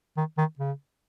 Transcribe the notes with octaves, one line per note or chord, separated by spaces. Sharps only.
D#3
D#3
C#3